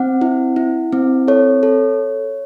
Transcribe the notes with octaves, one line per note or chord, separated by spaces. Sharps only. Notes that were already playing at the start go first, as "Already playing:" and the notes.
Already playing: C4 F#5
E4
E4
C4
A4 C#5
A4